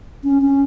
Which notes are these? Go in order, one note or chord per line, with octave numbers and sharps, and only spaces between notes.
C#4
C#4